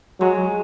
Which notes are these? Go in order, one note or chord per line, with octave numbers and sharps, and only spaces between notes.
F#3 G#3